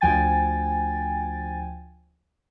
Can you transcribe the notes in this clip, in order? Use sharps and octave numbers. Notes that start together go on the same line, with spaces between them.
D2 F3 G5 G#5 A6